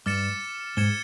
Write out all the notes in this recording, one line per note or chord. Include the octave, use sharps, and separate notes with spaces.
G2 D6 F6 A6 C#7 E7
G#2 G#6 C#7 E7 G7